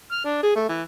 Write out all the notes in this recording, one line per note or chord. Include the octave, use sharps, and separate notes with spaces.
F6
D4
G#4
A3
E3